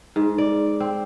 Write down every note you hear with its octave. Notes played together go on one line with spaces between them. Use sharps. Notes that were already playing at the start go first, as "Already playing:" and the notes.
G#2
D5
C4